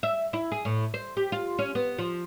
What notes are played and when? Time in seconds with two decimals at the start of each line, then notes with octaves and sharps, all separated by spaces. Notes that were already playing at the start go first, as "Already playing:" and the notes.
0.03 E5
0.33 E4
0.52 G#4
0.65 A2
0.94 C5
1.17 G4
1.32 F4
1.59 C#4
1.75 B3
1.98 F3